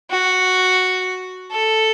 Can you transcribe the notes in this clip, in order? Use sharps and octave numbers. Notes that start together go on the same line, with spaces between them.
F#4
A4